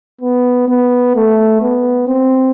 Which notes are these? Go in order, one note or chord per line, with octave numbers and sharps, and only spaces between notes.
B3
B3
A3
B3
C4